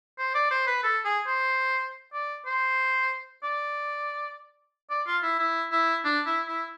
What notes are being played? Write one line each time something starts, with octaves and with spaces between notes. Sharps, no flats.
C5
D5
C5
B4
A4
G#4
C5
D5
C5
D5
D5
F4
E4
E4
E4
D4
E4
E4